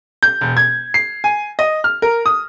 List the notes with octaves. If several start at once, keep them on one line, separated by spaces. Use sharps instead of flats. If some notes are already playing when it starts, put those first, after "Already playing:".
G6
E1
G#6
C7
G#5
D#5
F6
A#4
D#6